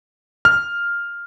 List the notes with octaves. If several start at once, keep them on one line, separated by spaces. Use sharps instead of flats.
F6